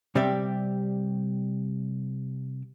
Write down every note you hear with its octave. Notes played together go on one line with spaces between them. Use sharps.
C3 G3 C4 G4 D5 E5